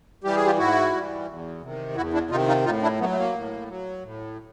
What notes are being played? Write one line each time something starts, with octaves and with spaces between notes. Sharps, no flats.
E3 G3 G4
G#4
F4 G4
G#2 E4 F#4
E3 G3
E2
C3 D#3
E2 E4 F#4
D4 E4
C3 D#3 D#4 F4
D#4 F4
A2 D#4 F4
D4 E4
F#3 A3 B3
A3
A#3
A2
F#3
A2